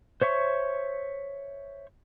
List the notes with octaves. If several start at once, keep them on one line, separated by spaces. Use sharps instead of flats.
C5 C#5 E5 C#6